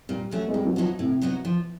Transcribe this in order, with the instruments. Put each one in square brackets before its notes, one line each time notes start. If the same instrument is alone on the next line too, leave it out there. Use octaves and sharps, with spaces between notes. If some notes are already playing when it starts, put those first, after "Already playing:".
[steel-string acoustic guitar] A#2 [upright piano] G3
[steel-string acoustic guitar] F#3 A3 C#4 F#4
[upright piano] G#3
[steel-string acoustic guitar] A2 [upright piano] G3
[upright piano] F#3
[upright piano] F3 [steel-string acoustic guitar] F#3 B3 D#4 F#4
[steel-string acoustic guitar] A2 [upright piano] C3
[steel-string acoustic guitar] F#3 B3 D#4 F#4
F3